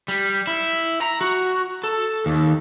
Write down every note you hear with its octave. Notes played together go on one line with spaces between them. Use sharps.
G3
E4
A#5
F#4
A4
D#2